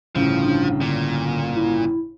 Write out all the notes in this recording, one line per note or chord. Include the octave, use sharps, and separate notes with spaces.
G1 A2 C#3 F3
D4
A#2 D3
E4